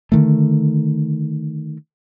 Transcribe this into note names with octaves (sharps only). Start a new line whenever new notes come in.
D3 D#3 A3